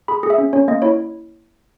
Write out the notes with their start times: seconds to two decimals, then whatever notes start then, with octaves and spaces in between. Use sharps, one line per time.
0.08 G#4 B5
0.23 G#4
0.30 E5
0.38 C#4
0.53 C#4 C#5
0.68 A#3 D#5
0.82 E4 C#5